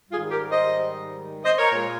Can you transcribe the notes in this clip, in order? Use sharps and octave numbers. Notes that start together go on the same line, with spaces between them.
G#2 D#3 G3 F4 G#4
G4 A#4
C5 D#5
C5 D#5
A#4 C#5
A#2 G#3